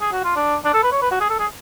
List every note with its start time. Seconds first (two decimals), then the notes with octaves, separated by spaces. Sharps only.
0.01 G#4
0.12 F#4
0.24 F4
0.36 D4
0.65 D4
0.74 A4
0.83 B4
0.92 C#5
1.02 B4
1.11 F#4
1.21 G#4
1.30 A4
1.40 G#4